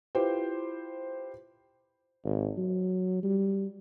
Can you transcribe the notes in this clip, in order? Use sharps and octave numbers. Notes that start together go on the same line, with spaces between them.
E4 F4 G4 B4 C5
G#1
F#3
G3